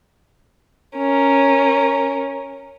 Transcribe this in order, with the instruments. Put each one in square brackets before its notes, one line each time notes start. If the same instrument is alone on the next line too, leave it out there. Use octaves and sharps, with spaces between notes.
[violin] C#4 A#4